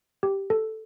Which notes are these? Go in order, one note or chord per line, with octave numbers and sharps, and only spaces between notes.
G4
A4